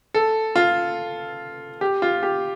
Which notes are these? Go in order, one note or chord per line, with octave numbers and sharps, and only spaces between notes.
A4
F4
G4
F4
G4